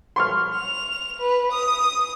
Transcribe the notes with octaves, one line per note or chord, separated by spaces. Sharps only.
C6 C#6 F6
F7
B4
D#6